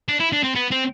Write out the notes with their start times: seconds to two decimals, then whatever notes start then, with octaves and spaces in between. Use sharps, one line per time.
0.08 D4
0.20 E4
0.33 D4
0.44 C4
0.55 B3
0.72 C4